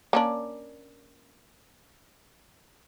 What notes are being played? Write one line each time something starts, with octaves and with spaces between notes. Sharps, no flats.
A#3 C#4 D4